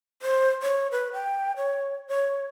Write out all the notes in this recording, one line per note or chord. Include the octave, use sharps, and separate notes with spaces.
C5
C#5
B4
G5
C#5
C#5